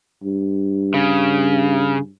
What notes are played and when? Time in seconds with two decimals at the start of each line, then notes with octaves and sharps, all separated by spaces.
0.23 G2
0.94 C#3